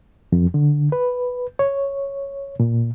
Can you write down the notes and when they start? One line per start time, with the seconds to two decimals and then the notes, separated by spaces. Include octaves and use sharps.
0.32 F2
0.54 D3
0.92 B4
1.59 C#5
2.60 A#2